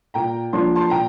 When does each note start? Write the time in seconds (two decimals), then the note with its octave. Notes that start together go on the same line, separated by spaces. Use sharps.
0.14 A#2 G5 A#5
0.53 F3 A#3 D4 C6
0.75 A5 C6
0.90 A#2 G5 A#5